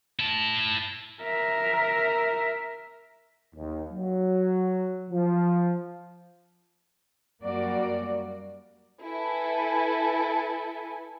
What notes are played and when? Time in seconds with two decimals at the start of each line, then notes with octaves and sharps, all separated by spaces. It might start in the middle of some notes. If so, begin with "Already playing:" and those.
0.19 E4 A5
1.23 A#4 E5
3.55 D#2
3.92 F#3
5.10 F3
7.43 F#2 G3 A#3 F#4 D5
9.03 E4 A4 B4 G#5